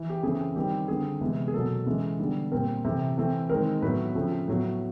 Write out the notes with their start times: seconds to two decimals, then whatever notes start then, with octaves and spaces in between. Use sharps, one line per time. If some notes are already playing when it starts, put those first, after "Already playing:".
Already playing: E3
0.10 G4
0.23 C#3 E3 A3 C4 G#4
0.56 D#3 G3 C4 G4
0.88 D3 G3 C4 G#4
1.21 C3 E3 G#3 B3
1.48 G#4
1.54 B2 F#3 A#3 A4
1.86 C#3 E3 G#3
2.20 D3 G3 B3
2.52 A#2 G3 C4 A#4
2.84 C3 E3 A3 C4
3.17 E3 A3 C4
3.50 D#3 G#3 C4 A#4
3.82 A2 F#3 B3 B4
4.15 C#3 F3 A3 C4
4.48 A2 F#3 B3